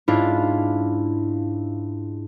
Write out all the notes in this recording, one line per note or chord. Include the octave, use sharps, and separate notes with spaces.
G#2 C#4 D4 E4 F4